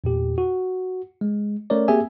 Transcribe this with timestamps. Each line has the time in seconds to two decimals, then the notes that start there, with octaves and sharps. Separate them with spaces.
0.04 E2 A#2 G4
0.38 F#4
1.21 G#3
1.70 A3 C#4 A#4 C#5 D5
1.88 A#3 C4 G4 G#4 E5 G#5